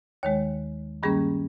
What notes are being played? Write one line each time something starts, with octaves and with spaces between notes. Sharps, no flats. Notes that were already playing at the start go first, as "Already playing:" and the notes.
D#2 D#3 G#3 C#5
G2 D#3 G3 A#3 C#4 G#4